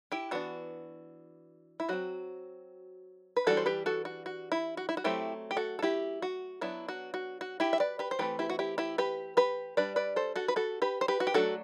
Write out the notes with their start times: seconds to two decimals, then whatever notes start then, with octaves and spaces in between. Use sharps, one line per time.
0.12 E4 G4
0.31 E3 B3 D4 F#4
1.80 E4
1.89 F#3 C4 F#4
3.37 B4
3.47 E3 G3 D4 F#4 A4
3.57 C5
3.66 G4 B4
3.86 F#4 A4
4.05 F#4
4.26 F#4
4.52 E4
4.77 F#4
4.89 E4
4.97 F#4
5.04 F#3 A3 C4 E4 G4
5.51 G4
5.57 F#4 A4
5.79 A4
5.82 E4 G4
6.22 F#4
6.61 F#3 B3 D4 E4
6.88 F#4
7.14 F#4
7.41 F#4
7.60 E4 G4
7.73 E5
7.80 B4 D5
7.99 G4 B4
8.11 C5
8.19 E3 A3 C4 G4 B4
8.39 E4 G4
8.50 F#4
8.59 E4 G4
8.78 E4 G4
8.98 G4 B4
9.37 G4 B4
9.77 G3 D4 B4 D5
9.96 B4 D5
10.16 A4 C5
10.36 F#4 A4
10.48 B4
10.56 F#4 A4
10.82 G4 B4
11.01 C5
11.08 G4 B4
11.20 F#4
11.27 G4
11.34 F#3 A3 D4 F#4 A4